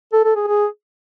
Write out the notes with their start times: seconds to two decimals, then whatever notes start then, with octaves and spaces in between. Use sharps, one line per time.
0.13 A4
0.24 A4
0.36 G#4
0.47 G#4